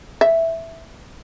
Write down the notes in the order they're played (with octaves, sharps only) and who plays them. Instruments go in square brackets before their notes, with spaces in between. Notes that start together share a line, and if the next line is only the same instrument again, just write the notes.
[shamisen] E5